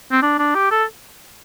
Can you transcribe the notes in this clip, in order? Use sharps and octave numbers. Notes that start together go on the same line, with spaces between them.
C4
D4
D4
G4
A4